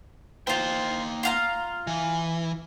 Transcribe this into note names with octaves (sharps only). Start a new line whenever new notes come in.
A#3 F4 C5 G5
F4 F5 A#5
E3